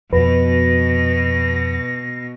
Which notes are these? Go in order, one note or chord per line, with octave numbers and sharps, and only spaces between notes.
F2 B2 B4 A#6